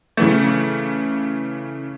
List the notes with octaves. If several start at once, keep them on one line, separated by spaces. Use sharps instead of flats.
C#3 E3 A3